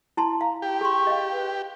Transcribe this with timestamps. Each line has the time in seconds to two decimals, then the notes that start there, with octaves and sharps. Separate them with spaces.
0.17 E4 A5 C6
0.41 F5 A#5
0.62 G4 G5
0.81 G#4 C6 C#6
1.07 D#5 F5
1.32 B4